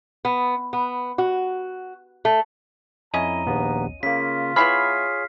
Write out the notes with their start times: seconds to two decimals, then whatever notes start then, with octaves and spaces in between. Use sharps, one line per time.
0.25 B3
0.73 B3
1.18 F#4
2.25 A3
3.14 F2 C#4 E4 D#5 A#5 D#7
3.46 A#1 D#2 B3
4.03 C#3 A#3 F4 B6
4.56 B3 E4 G#4 C#5 B5 F6 B6 C7